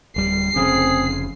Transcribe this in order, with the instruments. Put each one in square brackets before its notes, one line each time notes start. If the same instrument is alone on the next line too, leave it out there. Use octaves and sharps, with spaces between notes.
[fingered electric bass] D1 G3 [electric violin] C7
[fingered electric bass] F1 F2 C#3 [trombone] C4 [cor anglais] G#4